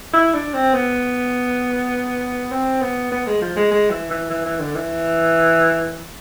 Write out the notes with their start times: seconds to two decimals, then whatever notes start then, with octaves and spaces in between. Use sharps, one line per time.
0.14 E4
0.34 D4
0.54 C4
0.74 B3
2.52 C4
2.82 B3
3.12 B3
3.27 G#3
3.42 F3
3.56 G#3
3.71 G#3
3.90 E3
4.11 E3
4.30 E3
4.46 E3
4.60 D3
4.76 E3